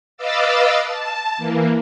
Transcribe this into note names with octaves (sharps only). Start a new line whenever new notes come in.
B4 D#5 F5 D6 E6 A6
A5
E3 A#3